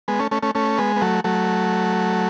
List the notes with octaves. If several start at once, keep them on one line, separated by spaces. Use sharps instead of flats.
G#3 B3
A3 C#4
A3 C#4
A3 C#4
A3 C#4
G#3 B3
B3
F#3 A3
F#3 A3